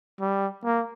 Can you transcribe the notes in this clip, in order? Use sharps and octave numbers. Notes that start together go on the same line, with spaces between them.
G3
A#3